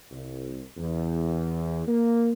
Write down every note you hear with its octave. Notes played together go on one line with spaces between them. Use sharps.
C2
E2
A#3